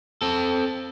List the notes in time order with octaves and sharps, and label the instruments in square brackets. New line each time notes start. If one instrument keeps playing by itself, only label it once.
[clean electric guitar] C4 A4